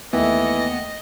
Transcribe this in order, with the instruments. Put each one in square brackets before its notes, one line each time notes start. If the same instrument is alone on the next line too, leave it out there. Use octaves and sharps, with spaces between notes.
[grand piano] D#2 A3 [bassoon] E3 [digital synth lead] B3 [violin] D#5